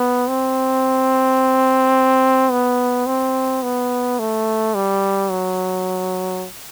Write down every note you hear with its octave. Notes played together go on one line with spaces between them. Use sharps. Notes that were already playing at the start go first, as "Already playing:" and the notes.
Already playing: B3
C4
B3
C4
B3
A3
G3
F#3